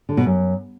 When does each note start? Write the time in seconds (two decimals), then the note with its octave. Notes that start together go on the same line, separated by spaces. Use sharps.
0.09 D3
0.17 B2
0.26 F#2